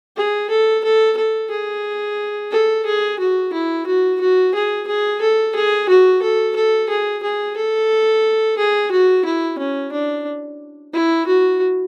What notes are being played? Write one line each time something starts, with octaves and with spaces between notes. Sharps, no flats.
G#4
A4
A4
A4
G#4
A4
G#4
F#4
E4
F#4
F#4
G#4
G#4
A4
G#4
F#4
A4
A4
G#4
G#4
A4
G#4
F#4
E4
C#4
D4
E4
F#4